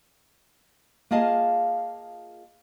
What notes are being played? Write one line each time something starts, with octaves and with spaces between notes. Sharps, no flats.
A#3 F4 G#4 D#5 F5 A5